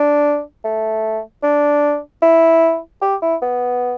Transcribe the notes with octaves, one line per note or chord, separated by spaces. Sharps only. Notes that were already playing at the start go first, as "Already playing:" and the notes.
Already playing: D4
A3
D4
E4
G4
E4
B3